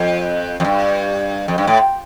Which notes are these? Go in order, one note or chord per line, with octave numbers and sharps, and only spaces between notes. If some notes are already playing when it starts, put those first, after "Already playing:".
Already playing: F2
F2
G2
F2
G2
A2